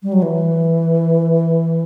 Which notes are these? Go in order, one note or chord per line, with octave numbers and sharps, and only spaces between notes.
G3
F#3
E3